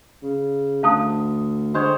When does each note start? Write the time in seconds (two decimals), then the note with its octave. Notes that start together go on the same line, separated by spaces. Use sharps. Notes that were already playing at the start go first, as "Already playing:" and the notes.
0.23 C#3
0.83 D2 F5 A5 D#6
1.74 D3 G#3 C5 C#5